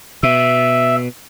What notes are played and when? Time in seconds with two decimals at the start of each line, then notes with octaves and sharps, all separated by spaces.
0.23 B2 E5